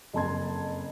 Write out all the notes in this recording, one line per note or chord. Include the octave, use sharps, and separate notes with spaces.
F#1 F2 A5 C6 G#6